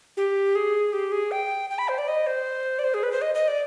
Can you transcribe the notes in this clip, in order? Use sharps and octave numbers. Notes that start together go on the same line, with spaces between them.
G4
G#4
G4
G#4
G5
G5
B5
C5
D5
D#5
C5
D5
C5
G#4
B4
C5
D#5
D#5
D5